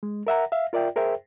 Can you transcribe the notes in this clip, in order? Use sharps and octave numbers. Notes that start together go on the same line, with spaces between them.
G#3
A#4 E5 F#5 A#5
E5 F5
F4 A#4 D5 E5 G5
G#4 A#4 C5 E5 G5